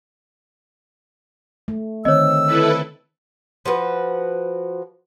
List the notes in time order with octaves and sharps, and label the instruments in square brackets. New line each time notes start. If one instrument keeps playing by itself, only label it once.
[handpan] A3
[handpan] D3 D#3 C4 [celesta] C#5 D#5 [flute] E6
[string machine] E4 A4 B4
[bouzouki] F3 F#4 A4 B4